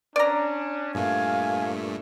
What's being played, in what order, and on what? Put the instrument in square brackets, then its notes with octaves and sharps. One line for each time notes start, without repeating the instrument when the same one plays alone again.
[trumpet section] C#4 D4 [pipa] D5 A#5
[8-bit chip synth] G2 A#2 A3 [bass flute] F5 [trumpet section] G#5